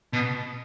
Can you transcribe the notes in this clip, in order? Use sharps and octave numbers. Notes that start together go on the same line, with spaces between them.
B2